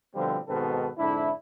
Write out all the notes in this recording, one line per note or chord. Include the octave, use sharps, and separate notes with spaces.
B2 D3 F3 G3 C4
G#2 B2 D#3 C4 A4 B4
F2 G#2 D3 D4 E4